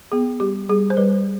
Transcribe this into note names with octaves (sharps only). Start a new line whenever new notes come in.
B3 G#4
G3 G4
G3 G#4
C5
G3 B4